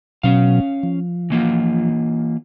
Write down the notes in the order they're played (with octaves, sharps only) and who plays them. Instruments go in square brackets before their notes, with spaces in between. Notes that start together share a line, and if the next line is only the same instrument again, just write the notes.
[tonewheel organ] B2 F#3 [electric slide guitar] C#4 F5
[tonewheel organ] F3
[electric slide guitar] E3 A#3 F4